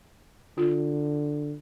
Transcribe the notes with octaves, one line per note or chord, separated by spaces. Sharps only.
D3 F4